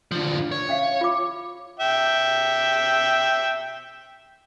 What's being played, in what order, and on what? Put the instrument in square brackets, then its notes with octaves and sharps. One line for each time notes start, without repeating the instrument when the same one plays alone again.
[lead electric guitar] D3 F3
C#5
[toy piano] C#4 E5 F5
F4 D6
[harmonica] E5 G5